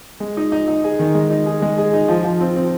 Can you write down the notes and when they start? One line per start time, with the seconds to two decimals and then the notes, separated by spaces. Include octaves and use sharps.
0.20 G#3
0.37 D#4
0.52 D#4
0.68 D#4
0.84 G#4
0.99 D#3
1.15 G#3
1.30 D#4
1.46 G#4
1.62 G#3
1.78 G#4
1.93 D#4
2.08 F3
2.24 F3
2.41 C4
2.56 C4